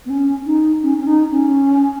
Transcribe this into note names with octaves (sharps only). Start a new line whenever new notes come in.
B3
C#4
D#4
C#4
C#4
D#4
C#4